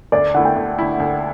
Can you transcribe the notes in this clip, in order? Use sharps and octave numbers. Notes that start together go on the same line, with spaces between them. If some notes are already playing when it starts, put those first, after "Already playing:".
D2 D5
D3 A3 E4 F#5
G5
D2
D3 A3 E4
D2